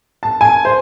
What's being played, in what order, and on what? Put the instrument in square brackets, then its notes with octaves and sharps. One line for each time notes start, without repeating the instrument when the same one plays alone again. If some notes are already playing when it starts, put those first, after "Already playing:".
[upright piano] A5
G#5
C5